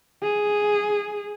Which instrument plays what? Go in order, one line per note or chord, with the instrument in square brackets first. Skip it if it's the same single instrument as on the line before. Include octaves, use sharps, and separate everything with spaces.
[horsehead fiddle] G#4